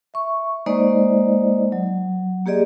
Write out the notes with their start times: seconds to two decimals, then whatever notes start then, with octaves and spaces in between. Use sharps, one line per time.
0.14 E5 C#6
0.66 G#3 A#3 D#4 C5 D5 D#5
1.72 F#3
2.46 A#3 G4 G#4 D5 D#5